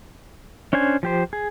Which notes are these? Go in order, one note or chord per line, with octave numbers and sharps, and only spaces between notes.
C#4 D4 C5 G#5
F3 G4 C5
G#4